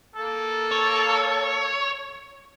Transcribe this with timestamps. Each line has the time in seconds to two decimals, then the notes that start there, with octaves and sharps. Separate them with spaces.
0.15 A#3 A4
0.71 C#5